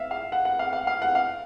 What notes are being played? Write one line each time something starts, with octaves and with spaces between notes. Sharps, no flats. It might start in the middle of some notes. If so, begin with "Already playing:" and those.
Already playing: E5 F5
F5
F#5
F#5
F5
F5
F5
F#5
F5